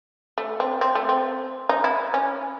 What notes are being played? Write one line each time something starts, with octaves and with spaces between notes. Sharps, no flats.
A3
C4
C4
A3
C4
D#4
E4
C#4